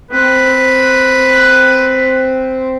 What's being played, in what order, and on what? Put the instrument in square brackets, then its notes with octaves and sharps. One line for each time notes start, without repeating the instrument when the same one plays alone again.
[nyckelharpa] C4 [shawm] B4